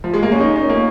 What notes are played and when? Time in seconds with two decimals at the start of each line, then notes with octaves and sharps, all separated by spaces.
0.04 F3
0.14 G#3
0.23 A#3
0.32 C#4
0.40 D#4
0.56 C#4
0.70 A#3